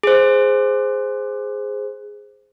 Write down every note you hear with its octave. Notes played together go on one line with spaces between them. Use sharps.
G#4 C5